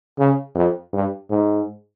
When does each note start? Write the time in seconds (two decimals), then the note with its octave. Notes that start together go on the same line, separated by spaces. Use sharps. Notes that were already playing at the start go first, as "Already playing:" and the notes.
0.18 C#3
0.55 F2
0.93 G2
1.30 G#2